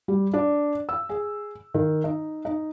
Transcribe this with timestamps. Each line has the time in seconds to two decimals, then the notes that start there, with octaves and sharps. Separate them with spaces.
0.08 G3
0.34 D4
0.89 E6
1.09 G#4
1.74 D#3
2.04 D#4
2.45 D#4